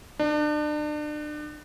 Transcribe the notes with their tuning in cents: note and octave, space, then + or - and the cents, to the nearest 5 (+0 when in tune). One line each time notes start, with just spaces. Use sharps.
D4 +35